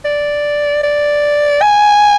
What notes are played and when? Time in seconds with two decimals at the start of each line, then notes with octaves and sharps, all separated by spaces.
0.05 D5
0.83 D5
1.62 G#5